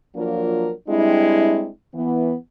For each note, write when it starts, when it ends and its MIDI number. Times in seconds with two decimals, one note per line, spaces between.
0.16 0.71 53
0.16 0.71 54
0.16 0.71 58
0.16 0.71 62
0.16 0.71 65
0.16 0.71 70
0.89 1.69 55
0.89 1.69 56
0.89 1.69 60
0.89 1.69 62
0.89 1.69 64
1.94 2.35 52
1.94 2.35 59